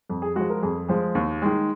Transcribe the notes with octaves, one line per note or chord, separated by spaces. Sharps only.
F2
G#4
F3 G#3 F#4
A#4
F2 G#4
F3 G#3
D#2
D#3 G#3